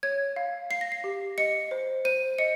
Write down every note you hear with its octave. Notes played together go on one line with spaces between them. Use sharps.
C#5 G#6
F5
F5 C7
A#6
C7
G4
D#5 C#7
C5
C5 D#7
D#5 C#7